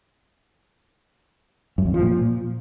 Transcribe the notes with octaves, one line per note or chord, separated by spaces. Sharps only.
F#2
F2
F3
A#2